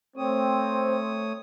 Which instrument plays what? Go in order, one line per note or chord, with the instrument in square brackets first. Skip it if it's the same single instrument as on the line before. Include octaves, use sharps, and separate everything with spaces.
[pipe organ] A3 C#5 D#6 [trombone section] C4